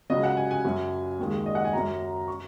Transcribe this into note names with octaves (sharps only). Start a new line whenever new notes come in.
C#2 C#3 F#3 D#5
F#5
G#5
G#5
F#2 F#3
D#2 D#3 G#3
D#5
F#5
G#5
F#2 F#3 A#5
C#6